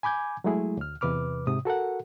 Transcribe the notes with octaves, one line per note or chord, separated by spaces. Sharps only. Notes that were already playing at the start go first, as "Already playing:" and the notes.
G#5 B5 D6 G6 G#6
F#3 G#3 A3 E4 G#4
D2 F6
E2 C3 B4 D6 F6
G#2 C3 D#6
F#4 A4 A#4 F#5